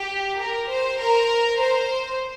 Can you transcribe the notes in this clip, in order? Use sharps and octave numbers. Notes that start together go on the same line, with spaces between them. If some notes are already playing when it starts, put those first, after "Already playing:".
Already playing: G4
A#4
C5
A#4
C5